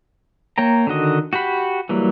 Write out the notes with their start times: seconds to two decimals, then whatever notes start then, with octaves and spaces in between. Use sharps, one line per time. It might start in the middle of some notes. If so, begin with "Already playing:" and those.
0.58 A#3 C#5 G5 A#5
0.87 D3 D#3 F#4 D#5
1.33 F#4 G4 F#5 B5
1.89 E3 F#3 G3 A#3